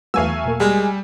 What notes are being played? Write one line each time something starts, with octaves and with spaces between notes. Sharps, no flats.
E2 F#3 A3 B3 F5 G#5 E6
B2 A#3
G3 G#3 G#4